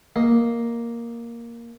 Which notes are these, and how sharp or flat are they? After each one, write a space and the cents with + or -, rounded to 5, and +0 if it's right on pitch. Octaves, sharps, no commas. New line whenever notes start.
A#3 +0 D#5 +0